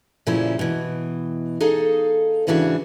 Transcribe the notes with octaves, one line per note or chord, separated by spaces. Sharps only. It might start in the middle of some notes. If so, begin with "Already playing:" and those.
A#2 C#3 F3 G3 C#4 E4
B2 E3
D#4 G#4 A4 F5
G#2 C#3 E3 D4 F4 F#4